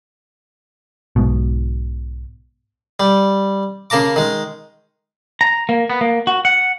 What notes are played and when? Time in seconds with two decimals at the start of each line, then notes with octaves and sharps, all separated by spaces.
1.16 B1 G#2 B2
3.00 G3
3.90 C#3 A#3 A5 A#5 D6
4.16 D#3 G#3
5.41 A#5
5.69 A#3
5.90 B3
6.01 A#3
6.27 F#4
6.45 F#5